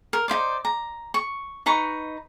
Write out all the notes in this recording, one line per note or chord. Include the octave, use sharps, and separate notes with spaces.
A#4
D#4 E4 C5 D5
A#5
C#6
D#4 B4 A#5 C#6